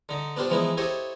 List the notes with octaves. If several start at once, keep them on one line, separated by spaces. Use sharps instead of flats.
D3 D#4
B3 D4 F4 G4 C5
E3 F3 G#3 B3 D#4 E4
E4 G4 A4 C5 C#5 D#5